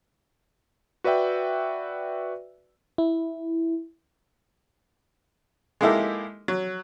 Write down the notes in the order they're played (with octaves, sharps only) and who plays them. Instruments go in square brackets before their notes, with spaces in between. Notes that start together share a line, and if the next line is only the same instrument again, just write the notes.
[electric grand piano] F#4 B4 D5 E5 G5
[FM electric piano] E4
[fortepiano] G#3 A#3 D#4 E4 G4 A4
F#3